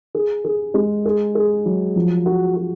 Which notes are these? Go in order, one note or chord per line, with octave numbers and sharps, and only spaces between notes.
G#4
G#4
G#3
G#4
G#4
F#3
F3
F#4
F#4